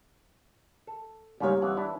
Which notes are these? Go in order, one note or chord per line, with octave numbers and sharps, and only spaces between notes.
A4
G#2 C#3 G3 A#3 C#5
F2 E3 F#5
E3 D4 E4